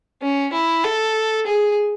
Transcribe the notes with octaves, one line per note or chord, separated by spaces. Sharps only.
C#4
E4
A4
G#4